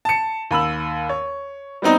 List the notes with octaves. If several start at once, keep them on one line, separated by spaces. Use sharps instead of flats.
A5 C#7
D#2 B5 E6 F#7
C#5
G3 B3 C4 D#4 D#5